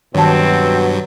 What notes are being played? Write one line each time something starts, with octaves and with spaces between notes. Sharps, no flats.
G2 B2 D#3 F#3 C4 A5